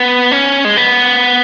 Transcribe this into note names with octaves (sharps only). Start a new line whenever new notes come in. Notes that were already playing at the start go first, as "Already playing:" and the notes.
Already playing: B3
C#4
G#3
B3